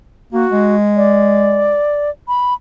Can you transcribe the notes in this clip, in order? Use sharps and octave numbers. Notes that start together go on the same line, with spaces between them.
A#3 F#4
G#3
D5
B5